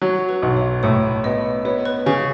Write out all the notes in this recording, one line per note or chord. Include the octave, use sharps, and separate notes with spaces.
F#3 C#5
B4
B1
C#5
A2 C#5
B3 D#5
B3 C#5
B4
C#3 B4